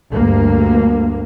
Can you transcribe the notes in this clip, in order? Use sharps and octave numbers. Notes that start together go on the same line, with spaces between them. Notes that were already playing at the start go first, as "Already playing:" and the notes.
D2 G2 A#3